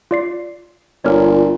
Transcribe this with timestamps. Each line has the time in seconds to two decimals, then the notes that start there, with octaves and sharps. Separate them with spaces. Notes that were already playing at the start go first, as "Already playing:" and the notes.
0.11 F4 D5 C7
1.05 G1 A#2 C#5 D5 F6